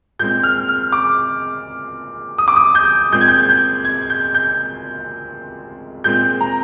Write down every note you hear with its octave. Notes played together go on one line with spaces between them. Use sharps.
A#2 G#3 C4 G6
F6
F6
D6
D#6
D6
D#6
G6
A#2 G#3 C4 G6
G#6
G6
G6
G#6
G6
G6
A#2 G#3 C4 G6
A#5